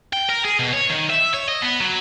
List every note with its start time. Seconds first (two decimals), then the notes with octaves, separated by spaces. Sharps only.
0.13 G5
0.29 A#4
0.45 G#4
0.59 B2
0.73 C#5
0.90 D#3
1.10 E5
1.34 C#5
1.49 D#5
1.62 B3
1.81 F#3